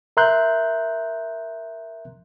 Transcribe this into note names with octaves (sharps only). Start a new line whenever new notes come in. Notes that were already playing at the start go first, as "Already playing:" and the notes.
A#4 E5 A#5 C6 F#6 G6